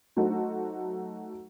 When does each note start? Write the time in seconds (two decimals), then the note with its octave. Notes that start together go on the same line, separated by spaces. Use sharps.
0.16 F#3 A3 D#4 F#4 A4 C5